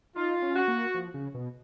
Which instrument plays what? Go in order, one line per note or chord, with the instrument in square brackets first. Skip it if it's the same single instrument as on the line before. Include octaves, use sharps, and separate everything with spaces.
[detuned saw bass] D#4 [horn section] F4
[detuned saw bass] C#4
[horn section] F#4
[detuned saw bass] A#3
F3
C#3
B2